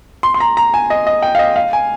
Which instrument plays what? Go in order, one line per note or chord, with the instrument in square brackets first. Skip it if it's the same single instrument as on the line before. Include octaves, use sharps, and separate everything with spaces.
[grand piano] C6
C6
A#5
A#5
G#5
D#5
D#5
G5
F5
D#5
F5
G#5